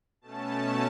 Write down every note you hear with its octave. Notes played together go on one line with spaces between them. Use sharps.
B2 A3 C#4 A5